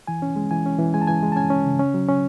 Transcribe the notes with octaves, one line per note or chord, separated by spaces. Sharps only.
E3 G#5
C#4
G#3
E3 G#5
C#4
E3
G#3 G#5
A5
E3 G#5
G#3
A5
C#4 G#5
C#4
C#3
C#4
F#3
C#4